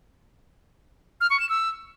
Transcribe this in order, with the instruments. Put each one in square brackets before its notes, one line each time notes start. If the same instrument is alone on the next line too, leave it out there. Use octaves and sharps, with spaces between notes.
[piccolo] F6
C#6
E7
E6